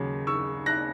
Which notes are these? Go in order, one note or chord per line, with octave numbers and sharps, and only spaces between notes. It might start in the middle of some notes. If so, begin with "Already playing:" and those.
Already playing: D#2 C#3 F#3
C#6 E6
F#6 A#6